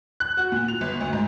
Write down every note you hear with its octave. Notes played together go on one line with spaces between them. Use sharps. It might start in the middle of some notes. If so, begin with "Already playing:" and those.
F#6
F#4
A#2
F7
G1
D2
G#2